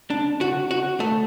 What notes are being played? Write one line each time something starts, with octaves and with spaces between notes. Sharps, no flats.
D4
F#4
F#4
A3